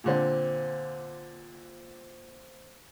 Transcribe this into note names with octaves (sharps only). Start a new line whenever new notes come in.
A#2 D3 C4